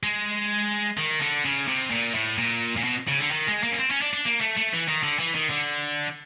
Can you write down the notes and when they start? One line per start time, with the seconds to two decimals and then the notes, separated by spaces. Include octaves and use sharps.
0.03 G#3
0.98 D#3
1.21 D3
1.45 C#3
1.68 C3
1.91 A#2
2.14 A2
2.38 A#2
2.77 A#2
2.84 B2
3.08 C#3
3.19 D3
3.31 D#3
3.47 G#3
3.63 A#3
3.72 C#4
3.78 C4
3.91 C#4
4.01 D4
4.13 D4
4.26 A#3
4.40 A3
4.57 A3
4.73 E3
4.88 D#3
5.03 D3
5.20 E3
5.35 D#3
5.50 D3